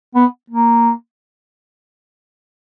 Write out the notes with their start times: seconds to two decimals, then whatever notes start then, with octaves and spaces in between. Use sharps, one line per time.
0.15 B3
0.50 A#3